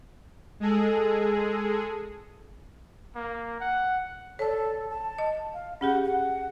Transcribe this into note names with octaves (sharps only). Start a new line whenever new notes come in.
G#3 G#4 A4
A#3
F#5
A4 C#5 D5
A5
D#5
F5
C#4 G4 G#4 F#5
F#5